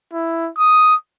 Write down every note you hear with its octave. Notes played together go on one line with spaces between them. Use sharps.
E4
D#6